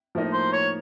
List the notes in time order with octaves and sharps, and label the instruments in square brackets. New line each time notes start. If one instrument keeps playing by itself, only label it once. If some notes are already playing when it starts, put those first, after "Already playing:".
[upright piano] A2 F3 A#3 D#4
[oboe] C5
C#5